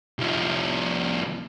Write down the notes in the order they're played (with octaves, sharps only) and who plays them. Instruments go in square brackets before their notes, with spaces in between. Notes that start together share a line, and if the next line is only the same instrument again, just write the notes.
[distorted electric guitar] C2 F3